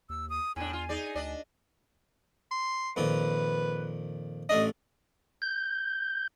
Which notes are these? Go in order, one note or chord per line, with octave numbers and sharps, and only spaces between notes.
D#2 E6
D#6
E2 A2 D4 G#5
F4
D#4 G#4 D5
D2 D4 D5 D#5
C6
F2 A#2 D#3 B4
A1 A3 D4 D#5
G6